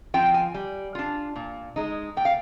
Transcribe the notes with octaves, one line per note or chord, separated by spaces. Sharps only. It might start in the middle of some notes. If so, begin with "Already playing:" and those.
F3 C4 F4 G5
G#5
G3
D4 F4
A#2
G#3 D#4
A#2 G5
F5